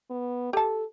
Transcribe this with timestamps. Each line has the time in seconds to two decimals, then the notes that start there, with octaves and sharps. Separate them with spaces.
0.10 B3
0.53 G4 A4 A5